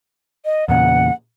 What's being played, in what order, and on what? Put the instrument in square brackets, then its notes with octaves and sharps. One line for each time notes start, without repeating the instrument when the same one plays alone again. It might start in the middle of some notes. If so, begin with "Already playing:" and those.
[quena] D#5
[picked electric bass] E2 A#2 C#3 [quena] F#5